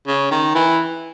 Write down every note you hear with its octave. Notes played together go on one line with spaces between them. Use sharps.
C#3
D#3
E3